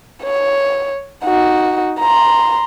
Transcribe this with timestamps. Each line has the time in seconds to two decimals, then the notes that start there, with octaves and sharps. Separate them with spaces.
0.23 C#5
1.25 D#4 F#4
2.00 A#5 C6